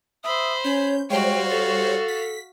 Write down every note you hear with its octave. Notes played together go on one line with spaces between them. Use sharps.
C5 E5 B5 D#6
C#4 C#5 G6
G3 G#3 F#4 C5 C#5 F5 G5
A4 A6
B6